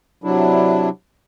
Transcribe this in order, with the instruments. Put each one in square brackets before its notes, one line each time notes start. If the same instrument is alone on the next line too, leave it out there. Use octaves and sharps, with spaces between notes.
[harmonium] C3 F#3 D4 E4